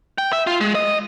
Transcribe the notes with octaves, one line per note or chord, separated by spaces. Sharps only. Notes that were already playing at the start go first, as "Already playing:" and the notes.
G5
E5
F4
G#3
D#5